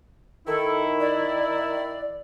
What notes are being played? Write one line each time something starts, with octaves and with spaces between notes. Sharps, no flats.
D#3 E4 A4
D5